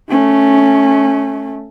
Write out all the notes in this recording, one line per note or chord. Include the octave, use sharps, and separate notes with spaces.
A3 C#4